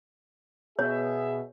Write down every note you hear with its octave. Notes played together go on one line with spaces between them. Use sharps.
B2 G#4 C#5 E5